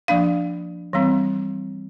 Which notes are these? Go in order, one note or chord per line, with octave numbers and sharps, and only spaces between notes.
F3 A#3 D4 F5
E3 G3 C4